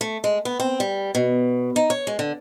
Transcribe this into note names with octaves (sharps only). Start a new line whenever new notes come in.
A3
G#3
B3
C4
G3
B2
D#4
C#5
G#3
D3